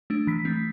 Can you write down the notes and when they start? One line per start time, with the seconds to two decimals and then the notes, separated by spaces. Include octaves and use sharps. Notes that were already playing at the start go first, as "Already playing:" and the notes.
0.10 A3 D4
0.27 E3 B6
0.45 A3 C4